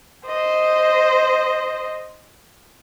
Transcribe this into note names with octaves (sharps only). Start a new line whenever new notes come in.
C5 D#5